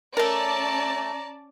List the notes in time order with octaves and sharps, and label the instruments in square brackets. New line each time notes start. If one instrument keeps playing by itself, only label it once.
[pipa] A3 A#4 [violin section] C#4 D5 A5 [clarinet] A#5